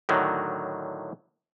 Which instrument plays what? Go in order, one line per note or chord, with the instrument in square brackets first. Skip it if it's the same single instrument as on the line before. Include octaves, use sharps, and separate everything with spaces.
[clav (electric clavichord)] A2 D3 D#3 F#3